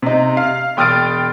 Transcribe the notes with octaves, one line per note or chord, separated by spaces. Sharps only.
C3 D#4
F5
E1 G5 D#6 F6 A6 D7